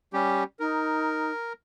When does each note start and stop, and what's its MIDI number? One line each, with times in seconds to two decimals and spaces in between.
0.13 0.44 55
0.13 0.44 61
0.13 0.44 67
0.60 1.32 63
0.60 1.53 70